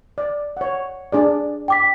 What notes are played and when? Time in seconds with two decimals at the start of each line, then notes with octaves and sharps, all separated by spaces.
0.18 D5
0.57 C#5 F#5
1.12 D4 G#4 D5
1.68 G5 D6 B6